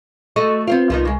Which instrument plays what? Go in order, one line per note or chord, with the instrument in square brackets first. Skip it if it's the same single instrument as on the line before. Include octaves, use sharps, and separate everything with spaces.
[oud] A3 F#4 D#5 [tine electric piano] C#6
[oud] B3 C5 F5 [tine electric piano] C4 F4
[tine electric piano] C2 [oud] F3 B3 D#4
[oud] C#3 G#3